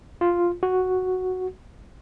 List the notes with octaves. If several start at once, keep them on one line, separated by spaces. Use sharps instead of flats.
F4
F#4